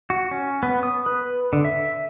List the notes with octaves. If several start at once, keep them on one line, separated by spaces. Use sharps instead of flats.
F#4
C#4
B3
D#6
B4
D3
E5